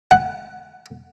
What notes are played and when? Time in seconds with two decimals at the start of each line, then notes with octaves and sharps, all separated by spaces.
0.11 F#5